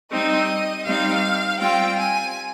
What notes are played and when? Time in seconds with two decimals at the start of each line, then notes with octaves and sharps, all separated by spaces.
0.11 G3 C4 D#4 D#5
0.86 G3 C4 D#4 F5
1.60 G3 C4 F4 G5
1.98 G#5